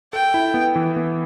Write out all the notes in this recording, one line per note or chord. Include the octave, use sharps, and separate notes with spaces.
A4 G5
E4
B3
E3
B3